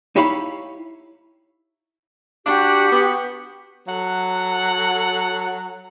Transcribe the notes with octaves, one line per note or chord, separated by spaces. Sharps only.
D#4 E4 G4 C#5 F5 B5
D4 F#4 G4
B3
F#3 A4 F#5